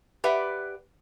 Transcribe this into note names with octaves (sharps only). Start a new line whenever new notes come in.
G4 B4 D5 E5 F#5